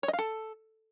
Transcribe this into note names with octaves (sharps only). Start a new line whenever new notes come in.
C#5
D#5
F5
A4